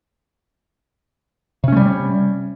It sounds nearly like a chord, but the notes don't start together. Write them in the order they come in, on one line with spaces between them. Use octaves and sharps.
C3 C#4 A3 G3